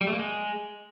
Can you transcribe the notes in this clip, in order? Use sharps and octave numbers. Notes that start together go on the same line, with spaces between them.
G3
A3
A#3
G#3